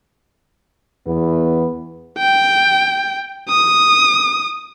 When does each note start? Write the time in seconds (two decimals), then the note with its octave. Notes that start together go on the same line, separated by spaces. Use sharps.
1.07 E2 B3
2.19 G5
3.49 D#6